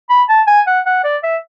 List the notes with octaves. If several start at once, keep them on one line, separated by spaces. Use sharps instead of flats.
B5
A5
G#5
F#5
F#5
D5
E5